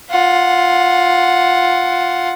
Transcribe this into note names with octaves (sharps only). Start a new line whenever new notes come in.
F4 F#5